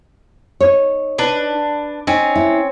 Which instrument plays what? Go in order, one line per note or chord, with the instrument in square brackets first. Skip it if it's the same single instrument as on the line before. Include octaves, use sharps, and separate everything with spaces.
[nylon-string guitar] D#4 C#5
[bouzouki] D4 B4
[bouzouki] C4 C#4 [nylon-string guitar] D#4
[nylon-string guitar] E4